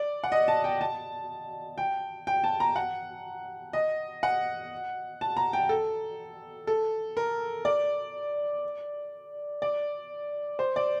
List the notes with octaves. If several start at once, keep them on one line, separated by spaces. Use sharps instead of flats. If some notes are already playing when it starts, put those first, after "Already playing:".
Already playing: D5
F#5
D#5
A5
G5
A5
G5
G5
A5
A#5
F#5
D#5
F#5
A5
A#5
G5
A4
A4
A#4
D5
D5
C5
D5